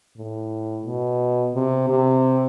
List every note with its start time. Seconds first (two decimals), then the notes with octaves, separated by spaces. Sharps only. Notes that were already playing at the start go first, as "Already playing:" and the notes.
0.17 A2
0.85 B2
1.55 C3
1.89 C3